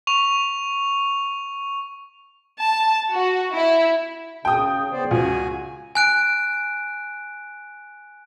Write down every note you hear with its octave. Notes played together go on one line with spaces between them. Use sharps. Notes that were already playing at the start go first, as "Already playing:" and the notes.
C#6 F7
A5
F#4
E4
C#3 G5 D#6
B3 C5 D5
C#2 F#4 G#5
G#5 F#6 D7